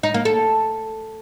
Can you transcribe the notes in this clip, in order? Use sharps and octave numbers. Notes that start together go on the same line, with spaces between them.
D#4
A#3
A4